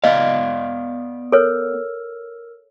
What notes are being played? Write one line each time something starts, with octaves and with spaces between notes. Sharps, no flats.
B3 D5 D#5 F5
A4 A#4 C#5 E6 F6